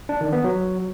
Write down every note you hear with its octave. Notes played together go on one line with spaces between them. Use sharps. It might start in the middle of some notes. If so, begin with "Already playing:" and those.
D4
D#3
B3
F#3